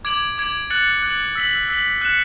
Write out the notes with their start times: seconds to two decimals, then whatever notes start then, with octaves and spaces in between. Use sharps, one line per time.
0.05 D6 G#6 D7 F#7
0.38 D6 G#6 D7 F#7
0.70 F#6 A6 C#7 F#7
1.03 F#6 A6 C#7 F#7
1.35 E6 B6 F#7
1.69 E6 B6 F#7
2.01 F#6 C#7 E7